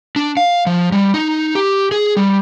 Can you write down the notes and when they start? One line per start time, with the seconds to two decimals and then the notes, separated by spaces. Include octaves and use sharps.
0.16 D4
0.37 F5
0.67 F3
0.92 G3
1.14 D#4
1.55 G4
1.92 G#4
2.17 G3